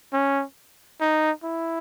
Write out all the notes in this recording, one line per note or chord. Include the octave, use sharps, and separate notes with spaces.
C#4
D#4
E4